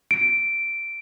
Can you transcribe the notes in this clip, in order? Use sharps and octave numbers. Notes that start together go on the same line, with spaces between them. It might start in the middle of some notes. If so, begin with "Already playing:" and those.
D7